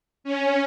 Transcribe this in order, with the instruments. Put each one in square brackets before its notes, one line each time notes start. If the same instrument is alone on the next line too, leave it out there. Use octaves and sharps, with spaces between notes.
[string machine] C#4